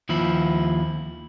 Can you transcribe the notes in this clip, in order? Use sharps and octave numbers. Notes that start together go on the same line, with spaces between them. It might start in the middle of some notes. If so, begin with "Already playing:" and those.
D#2 F3 E4